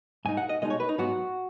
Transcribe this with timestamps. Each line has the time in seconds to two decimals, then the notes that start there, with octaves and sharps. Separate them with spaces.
0.25 G#2 G#3 D#4 G#5
0.37 F#5
0.49 D#5
0.62 B2 G#3 D#4 D#5
0.70 C#5
0.80 B4
0.89 D#4
0.98 G#2 F#3 B3 F#4